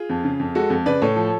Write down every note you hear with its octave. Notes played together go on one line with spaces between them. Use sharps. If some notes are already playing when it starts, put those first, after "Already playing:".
Already playing: F4 G#4
F2
C#3
F2
G#3 F#4 A4
F2
C#3 B4 D5
A2 A4 C#5
F3